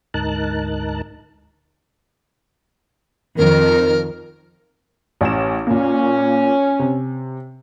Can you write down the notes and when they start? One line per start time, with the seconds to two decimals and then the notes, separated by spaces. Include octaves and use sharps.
0.14 D2 G#2 D#4 A#4 A5 F#6
3.37 F2 D#3 A#4
5.21 A1 C#4 E7
5.67 A#2 A#3 C#4
6.79 C3